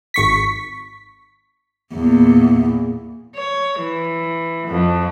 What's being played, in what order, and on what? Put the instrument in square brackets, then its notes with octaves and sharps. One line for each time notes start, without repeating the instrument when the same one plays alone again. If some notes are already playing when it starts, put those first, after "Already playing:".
[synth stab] G#1 C#6 B6
[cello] E2 A#2
[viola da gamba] C#5
E3
F2